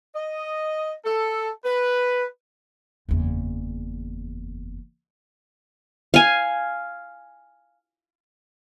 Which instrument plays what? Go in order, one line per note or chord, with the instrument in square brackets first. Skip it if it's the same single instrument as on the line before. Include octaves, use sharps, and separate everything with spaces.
[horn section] D#5
A4
B4
[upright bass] F#1 E2
[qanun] F5 G#5